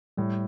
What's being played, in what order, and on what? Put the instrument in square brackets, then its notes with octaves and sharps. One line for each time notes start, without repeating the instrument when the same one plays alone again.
[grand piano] A2 [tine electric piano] G3